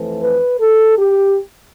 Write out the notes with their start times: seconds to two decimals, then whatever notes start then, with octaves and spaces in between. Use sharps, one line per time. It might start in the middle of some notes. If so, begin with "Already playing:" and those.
Already playing: F2 E3 A3 C4
0.22 B4
0.60 A4
0.97 G4